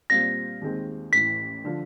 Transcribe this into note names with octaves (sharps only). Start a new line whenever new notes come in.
A#2 G3 C4 F4 A#6
D#2 D#3 G#3 C4
A1 A2 E3 B6
D3 F3